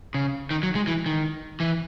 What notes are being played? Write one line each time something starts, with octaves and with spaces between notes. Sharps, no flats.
C#3
D#3
F#3
G#3
E3
D#3
E3